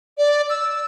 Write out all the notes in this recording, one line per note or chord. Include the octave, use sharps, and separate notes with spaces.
D5
E6